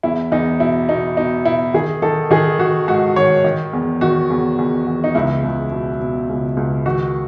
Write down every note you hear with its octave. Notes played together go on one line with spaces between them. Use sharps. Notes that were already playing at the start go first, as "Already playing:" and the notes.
E2 E4
E2 D#4
B2 E4
B2 D#4
B2 D#4
B2 E4
D#3 G#4
D#3 A4
D#3 G#4
D#3 F#4
G#2 F#4
D#3 C#5
D#3
E2
D#3 F#4
E2
E2
E2
D#4
C#2 E4
C#2
B2
B2
C#2
C#2
D#3 F#4